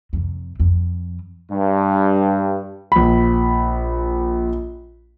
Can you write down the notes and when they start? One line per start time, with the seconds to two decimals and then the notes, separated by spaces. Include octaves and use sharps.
0.13 F2 C3
0.60 F2
1.50 G2
2.92 A#1 B5